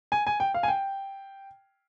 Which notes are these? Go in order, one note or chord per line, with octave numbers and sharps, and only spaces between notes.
G#5
G#5
G5
F5
G#5
G5